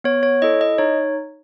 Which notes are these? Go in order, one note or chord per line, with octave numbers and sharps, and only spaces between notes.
B3 C#5
C#5
E4 A4 D#5
D#5
D#4 C#5